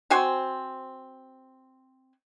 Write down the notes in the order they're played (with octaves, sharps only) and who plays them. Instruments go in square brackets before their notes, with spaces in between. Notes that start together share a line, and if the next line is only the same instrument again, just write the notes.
[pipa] C4 F#4 C5 G#5